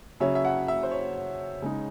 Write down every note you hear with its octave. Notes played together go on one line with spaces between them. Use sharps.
C#3 F#3 C#4 E5
E5
F#5
E5
C5
C#5
C#3 G#3 D#4